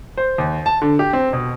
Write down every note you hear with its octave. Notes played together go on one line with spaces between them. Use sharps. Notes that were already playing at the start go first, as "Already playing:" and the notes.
C5
D#2
A5
D3
G4
C4
B2